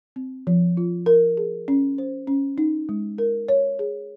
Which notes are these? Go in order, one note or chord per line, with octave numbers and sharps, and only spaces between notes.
C4
F3
F4
A#4
G#4
C#4
C5
C#4
D#4
G#3
A#4
C#5
G#4